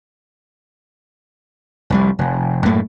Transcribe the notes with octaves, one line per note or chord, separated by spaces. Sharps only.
F1 C2 G3
F1
F#2 A2 A3 A#3